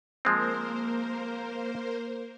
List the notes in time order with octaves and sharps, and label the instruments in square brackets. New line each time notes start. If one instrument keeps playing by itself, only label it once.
[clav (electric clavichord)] F3 G#3 C4 [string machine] A#3 A#4 C5